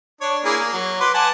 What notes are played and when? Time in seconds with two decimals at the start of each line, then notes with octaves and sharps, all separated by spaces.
0.21 D4 C#5
0.45 A#3 E4 G#4
0.59 A#3
0.73 F#3
1.01 B4 C6 D6
1.14 F#5 G#5 A5